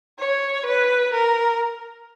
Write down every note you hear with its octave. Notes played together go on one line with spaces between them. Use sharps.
C#5
B4
A#4